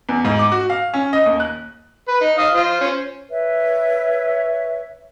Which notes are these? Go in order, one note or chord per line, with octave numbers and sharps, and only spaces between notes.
E2
G#2
D6
F#4
F5
C#4
D#5
D#2
F#6
B4
D#4
D#5 F5 D#6
F4 C5
C#4 C5
B4 C#5 E5